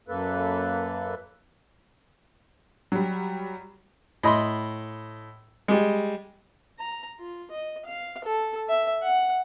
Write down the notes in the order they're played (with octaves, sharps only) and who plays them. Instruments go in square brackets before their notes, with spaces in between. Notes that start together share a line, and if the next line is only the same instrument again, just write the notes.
[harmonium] F#2 A#3 A4 B4
[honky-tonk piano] F#3 G3
[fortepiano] A2 D#5 B5 C6
G3 G#3
[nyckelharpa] A#5
F4
D#5
F5
A4
E5
F#5